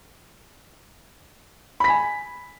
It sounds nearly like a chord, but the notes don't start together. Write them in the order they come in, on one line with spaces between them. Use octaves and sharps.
B5 B6 G#5